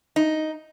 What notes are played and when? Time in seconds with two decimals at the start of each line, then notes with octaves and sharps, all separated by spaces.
0.16 D#4